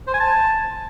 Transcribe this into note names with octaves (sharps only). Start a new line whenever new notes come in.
C5
G#5
A5